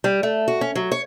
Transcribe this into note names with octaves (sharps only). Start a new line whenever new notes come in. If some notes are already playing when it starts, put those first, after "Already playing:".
G3
A3
F#4
C#4
F#3
C#5